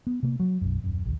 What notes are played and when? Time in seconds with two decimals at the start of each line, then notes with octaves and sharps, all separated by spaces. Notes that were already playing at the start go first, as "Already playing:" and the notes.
0.07 B3
0.23 C3 A#3
0.40 F#3
0.61 B1 F#2
0.84 D#1 F#2
1.05 A#1 D#2